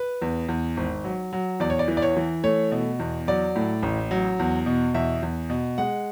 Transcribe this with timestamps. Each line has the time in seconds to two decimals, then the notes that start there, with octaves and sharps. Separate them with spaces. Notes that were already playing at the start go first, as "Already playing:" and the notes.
Already playing: B4
0.22 E2
0.48 E2
0.77 G#1
1.04 F#3
1.33 F#3
1.60 E2 D5
1.70 C#5
1.79 D5
1.88 E3
1.97 D5
2.02 C#5
2.17 E3
2.44 A3 C#5
2.72 B2
2.99 E2
3.27 F#3 D5
3.56 A2
3.83 A1
4.11 F#3
4.39 E2
4.66 B2
4.94 E2 E5
5.23 E2
5.50 B2
5.78 G#3 F#5